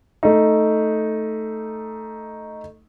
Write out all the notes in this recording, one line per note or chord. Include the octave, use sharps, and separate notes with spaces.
A3 D#4